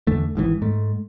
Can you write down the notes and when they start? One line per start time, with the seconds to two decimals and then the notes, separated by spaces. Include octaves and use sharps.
0.07 E2 D3 A3
0.35 G#1 G#2 C3 E3
0.62 G#2 A3